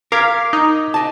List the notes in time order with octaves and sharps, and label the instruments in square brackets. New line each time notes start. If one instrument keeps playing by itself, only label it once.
[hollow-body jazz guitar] A#4 [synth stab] F5 [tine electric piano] D6 G#6 B6
[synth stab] D#4
[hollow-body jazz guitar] D#5 A5